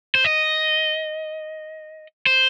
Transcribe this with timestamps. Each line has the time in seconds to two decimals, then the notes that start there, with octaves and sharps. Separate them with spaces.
0.15 C5
0.24 D#5
2.27 C5